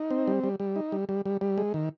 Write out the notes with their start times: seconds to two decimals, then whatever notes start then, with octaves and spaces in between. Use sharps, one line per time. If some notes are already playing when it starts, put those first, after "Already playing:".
Already playing: D#4
0.11 C4
0.28 G3
0.44 G3
0.60 G3
0.76 D#4
0.92 G3
1.09 G3
1.26 G3
1.41 G3
1.58 G#3
1.74 D#3